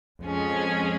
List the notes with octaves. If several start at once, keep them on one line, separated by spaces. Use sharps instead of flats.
F2 F3 G#3 C#4 G#4